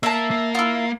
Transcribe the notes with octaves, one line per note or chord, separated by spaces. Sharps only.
A#3 E5 A5
A#3
E4 F4